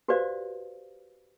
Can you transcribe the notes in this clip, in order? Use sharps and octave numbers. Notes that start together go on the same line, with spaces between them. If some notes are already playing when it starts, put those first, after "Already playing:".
F#4 G4 B4 C5 D5 F5